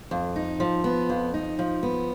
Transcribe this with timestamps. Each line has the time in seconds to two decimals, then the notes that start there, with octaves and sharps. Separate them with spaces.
0.11 F2
0.36 D#4
0.60 F3
0.84 B3
1.10 F2
1.34 D#4
1.59 F3
1.83 B3